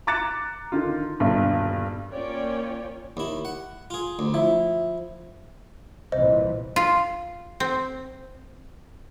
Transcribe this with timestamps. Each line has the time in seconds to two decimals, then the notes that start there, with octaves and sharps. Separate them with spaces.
0.07 A#5 D6 F#6 A6 C#7 E7
0.72 D3 D#3 F4
1.20 D#1 B1 G2 D3 D5
2.13 A#3 C#4 F4 C#5 D5 G5
3.17 D#2 E4
3.45 F#5
3.90 F4 G#4
4.19 D2
4.34 F3 E4
6.12 C2 A#2 E3 C5 D#5
6.76 F4
7.60 C4